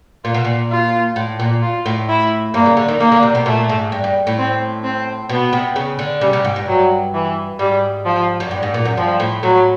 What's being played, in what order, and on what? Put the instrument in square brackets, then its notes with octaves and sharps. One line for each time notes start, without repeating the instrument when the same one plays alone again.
[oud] A#2 [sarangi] F4
[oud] B2
A#2
[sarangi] F4
[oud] A2
A#2
[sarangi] F4
[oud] A2
[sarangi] E4
[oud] G2 [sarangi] A#3
[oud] C#3
D3
D#3
[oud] D#3 [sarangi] A#3
[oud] D3
C3
B2
[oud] A#2 [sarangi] A3
[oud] G#2
G2
G2
A2
[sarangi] C4
C4
[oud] B2 [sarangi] B3
[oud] C3
C#3
D3
[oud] C#3 [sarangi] G3
[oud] C3
G#2
G2
[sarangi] F#3
E3
[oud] G#2 [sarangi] G3
[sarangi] F3
[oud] F#2
G2
G#2
A#2
F#2
[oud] G2 [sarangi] F3
[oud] A2
[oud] A2 [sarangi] F#3